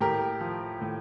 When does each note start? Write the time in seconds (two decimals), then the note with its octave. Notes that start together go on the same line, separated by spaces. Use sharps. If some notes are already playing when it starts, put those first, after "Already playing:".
0.01 A2 G4 A#4
0.41 F3
0.81 A2